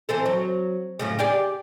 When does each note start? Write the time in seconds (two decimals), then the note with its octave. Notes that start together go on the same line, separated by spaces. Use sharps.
0.09 E3 C4 A4
0.26 F#3
0.99 F#2 A2 C#3
1.19 G4 G#4 D5